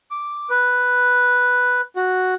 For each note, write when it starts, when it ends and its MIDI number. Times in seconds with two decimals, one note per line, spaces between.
0.11 0.49 86
0.50 1.81 71
1.96 2.34 66